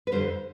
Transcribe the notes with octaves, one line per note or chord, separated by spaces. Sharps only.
B4
F2 D3 G3 C5